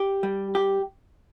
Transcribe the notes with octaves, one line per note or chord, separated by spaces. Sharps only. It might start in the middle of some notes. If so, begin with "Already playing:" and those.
Already playing: G4
G3
G4